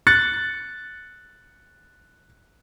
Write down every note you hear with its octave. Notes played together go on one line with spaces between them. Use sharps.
F#6 A6 C#7